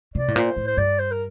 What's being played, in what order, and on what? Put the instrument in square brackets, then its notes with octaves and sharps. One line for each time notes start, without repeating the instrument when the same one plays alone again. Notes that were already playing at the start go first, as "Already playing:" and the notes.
[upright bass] C3 [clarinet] D5
[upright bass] A2
[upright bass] A#2 [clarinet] C5
[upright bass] A2
[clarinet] C5
[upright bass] G2 [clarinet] D5
[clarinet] C5
A#4